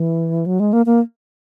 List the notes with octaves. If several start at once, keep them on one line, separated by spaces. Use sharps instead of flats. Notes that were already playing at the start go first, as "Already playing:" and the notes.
Already playing: E3
F#3
G#3
A#3
A#3